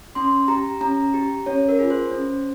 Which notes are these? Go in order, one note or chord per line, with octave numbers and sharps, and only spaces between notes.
C#4 C6
G4 A#5
C#4 A#5
G4
C#4 C#5
A#4
F4 G#4
C5
C#4